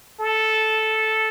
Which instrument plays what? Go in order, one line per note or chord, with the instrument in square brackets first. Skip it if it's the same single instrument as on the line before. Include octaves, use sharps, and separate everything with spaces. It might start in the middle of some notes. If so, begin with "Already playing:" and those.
[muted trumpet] A4